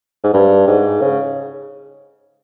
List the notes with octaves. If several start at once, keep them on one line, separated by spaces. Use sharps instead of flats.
G#2
G2
G#2
C#3